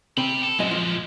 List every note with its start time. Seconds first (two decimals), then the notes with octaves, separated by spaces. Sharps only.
0.17 C3 G5 B5
0.43 A4
0.59 F#2 A#2 G#3 D#5
0.71 F3